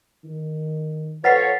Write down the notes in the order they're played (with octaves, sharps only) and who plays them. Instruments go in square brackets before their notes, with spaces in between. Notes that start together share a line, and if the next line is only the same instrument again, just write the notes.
[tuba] D#3
[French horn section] F3 A4 C#5 [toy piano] B4 F#5 [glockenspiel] A6 B6 C7